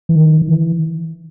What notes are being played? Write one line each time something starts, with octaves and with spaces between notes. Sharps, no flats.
E3
D#3
D#3
E3